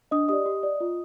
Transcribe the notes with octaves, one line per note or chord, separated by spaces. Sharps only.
D4 D#5 D#6
G4 D5 D#5 D#6
G4
D5
F4